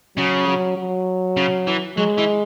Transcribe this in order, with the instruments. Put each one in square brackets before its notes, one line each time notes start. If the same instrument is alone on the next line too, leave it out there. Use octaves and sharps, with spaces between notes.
[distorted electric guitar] C#3 [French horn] F#3
[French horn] F#3
F#3
[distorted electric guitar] C#3
E3
[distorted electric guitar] F#3 [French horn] G#3
[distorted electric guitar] E3